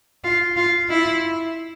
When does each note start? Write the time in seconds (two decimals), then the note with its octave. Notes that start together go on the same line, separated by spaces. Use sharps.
0.24 F4
0.56 F4
0.90 E4